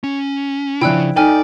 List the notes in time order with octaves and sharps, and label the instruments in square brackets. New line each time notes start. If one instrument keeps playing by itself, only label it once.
[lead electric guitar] C#4
[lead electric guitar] C#3 [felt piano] F3 D4 E4 [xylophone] G5 E6 F#6
[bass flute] D#4 [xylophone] A4 G#5 F6 [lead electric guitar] D5 [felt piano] G5